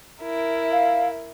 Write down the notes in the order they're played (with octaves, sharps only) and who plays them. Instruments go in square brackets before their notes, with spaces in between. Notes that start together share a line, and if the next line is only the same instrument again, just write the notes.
[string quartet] E4 A#4
[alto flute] F5